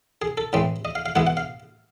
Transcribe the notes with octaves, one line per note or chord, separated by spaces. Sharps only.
G#4
A4
A2 E3 G#3 C4
D#5
F5
F5
E3 G#3 B3 E4 F#5
F#5
F5